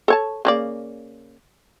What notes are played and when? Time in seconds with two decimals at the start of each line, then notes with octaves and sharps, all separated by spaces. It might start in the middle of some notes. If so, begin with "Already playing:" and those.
0.08 A4 C#5 A5
0.45 C#3 A#3 D5